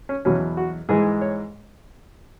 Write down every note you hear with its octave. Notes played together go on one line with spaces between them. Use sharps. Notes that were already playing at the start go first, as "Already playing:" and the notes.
C#4
E2 B2 F#3 C#4
F#4
G#2 E3 G#3 G#4
C#5